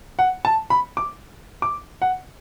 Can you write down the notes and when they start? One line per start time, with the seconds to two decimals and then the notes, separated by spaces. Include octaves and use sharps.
0.19 F#5
0.45 A5
0.70 B5
0.97 D6
1.62 D6
2.02 F#5